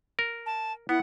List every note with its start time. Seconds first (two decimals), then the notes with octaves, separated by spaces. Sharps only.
0.19 A#4
0.46 A5
0.89 B3 E4 F#5